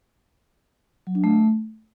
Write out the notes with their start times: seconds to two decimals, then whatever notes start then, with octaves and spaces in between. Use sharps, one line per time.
1.07 F#3
1.15 D4
1.24 A3